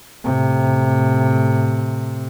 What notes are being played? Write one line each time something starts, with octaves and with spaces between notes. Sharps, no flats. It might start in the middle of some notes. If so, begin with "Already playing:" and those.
A2 C3